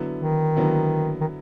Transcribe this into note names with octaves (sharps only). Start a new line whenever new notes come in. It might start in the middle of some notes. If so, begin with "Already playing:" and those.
Already playing: D3 F#3 B3 E4
D#3
D3 F#3 B3 E4
D#3